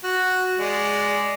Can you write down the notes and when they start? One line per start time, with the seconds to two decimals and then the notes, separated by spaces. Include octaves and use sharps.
0.04 F#4
0.59 G#3 D5